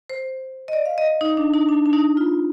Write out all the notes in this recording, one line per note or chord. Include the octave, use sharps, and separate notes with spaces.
C5
D#5
D5
F5
D#5
D#4
D4
D#4
D4
D4
D#4
F4